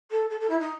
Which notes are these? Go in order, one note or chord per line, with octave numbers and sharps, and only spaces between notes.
A4
A4
A4
E4
D#4